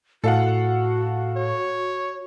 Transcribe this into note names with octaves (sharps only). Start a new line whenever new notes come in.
A2 F#4 A4 F5 F#5
C#5